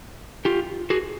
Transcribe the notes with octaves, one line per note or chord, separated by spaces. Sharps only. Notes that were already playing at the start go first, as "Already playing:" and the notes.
F4 G4
F#4 G#4